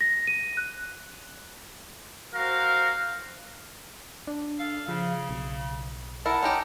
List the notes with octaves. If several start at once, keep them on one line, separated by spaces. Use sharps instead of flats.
A#6
D#7
F#6
F#4 A#4 C5 F5
D4
A4 F5
C#3 F3
B1
E4 A#4 F#5 A5
C#4 D#4 G4